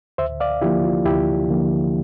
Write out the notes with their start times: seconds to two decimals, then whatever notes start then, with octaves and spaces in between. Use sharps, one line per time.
0.18 D2 C5 E5
0.40 D5 F5
0.62 D3 F3 A#3 E4 G4
0.84 F4
1.06 D2 E4 G4
1.50 D3 F3 A#3